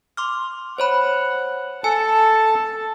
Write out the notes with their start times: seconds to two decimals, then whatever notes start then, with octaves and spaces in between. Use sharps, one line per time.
0.17 C6 D6 F6
0.78 C5 C#5 F#5 B5
1.84 A4 G#5 A5 C#7